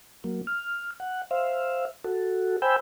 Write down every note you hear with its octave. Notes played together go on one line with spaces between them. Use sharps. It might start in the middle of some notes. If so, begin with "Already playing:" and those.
F#3 A#3
F6
F#5
C5 E5 F5
F#4 A4
C5 G5 G#5 B5 E6 G6